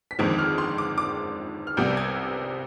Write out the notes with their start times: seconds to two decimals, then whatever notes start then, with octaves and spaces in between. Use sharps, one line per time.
0.11 B6
0.19 G1 F2 D#3 G#3 C4 G#6
0.39 F6
0.58 C6
0.78 D6
0.98 D6
1.67 F6
1.77 C2 C3 G3 B3 G6
1.97 G#6